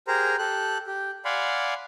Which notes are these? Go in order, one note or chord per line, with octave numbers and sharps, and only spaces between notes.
G4 G#4 A#4 C5 A#5
G4 A4 F#6
G4
D5 F5 F#5 G#5 B5 C6